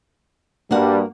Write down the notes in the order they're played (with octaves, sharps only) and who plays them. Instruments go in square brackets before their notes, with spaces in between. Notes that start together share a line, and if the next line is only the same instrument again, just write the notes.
[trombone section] G2 G3 [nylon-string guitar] A#3 F#4 F#5